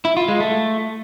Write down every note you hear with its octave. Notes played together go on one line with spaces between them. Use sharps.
E4
F4
G#3
A3